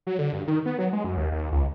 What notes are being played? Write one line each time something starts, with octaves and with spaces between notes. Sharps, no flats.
F#3
D3
G2
D#3
B3
F#3
G#3
F#2
D#2
D#2
C#2